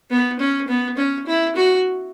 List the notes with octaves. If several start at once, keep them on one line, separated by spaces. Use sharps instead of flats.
B3
C#4
B3
C#4
E4
F#4